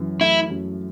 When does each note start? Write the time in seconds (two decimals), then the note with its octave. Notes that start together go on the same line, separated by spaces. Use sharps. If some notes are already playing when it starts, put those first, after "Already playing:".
Already playing: F#2 E3
0.21 A3 E4
0.50 F#2